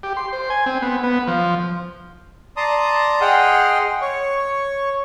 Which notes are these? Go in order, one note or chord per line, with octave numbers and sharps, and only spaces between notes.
G4
C6
C5
G#5
C4
B3
B3
F3
D5 A5 A#5 C6 D#6
G#4 D#5 F#5 G5 C6 F6
C#5 C#6